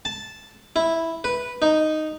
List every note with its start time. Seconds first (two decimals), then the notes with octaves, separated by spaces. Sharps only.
0.05 A5
0.76 E4
1.24 B4
1.62 D#4